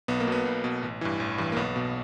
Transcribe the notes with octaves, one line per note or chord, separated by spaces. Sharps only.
B1 B3
A#3
B2 B3
B1
B2
A1
G2 E3
A1
G2 E3
A#3
B1 B3
B2